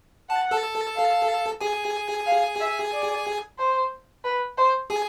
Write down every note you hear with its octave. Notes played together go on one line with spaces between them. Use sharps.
F#5 A5
A4 A5
F5
G#4 G#5
F5
E5
D5
C5
B4
C5
G#4 G#5